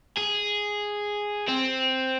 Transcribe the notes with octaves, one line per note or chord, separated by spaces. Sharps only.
G#4
C4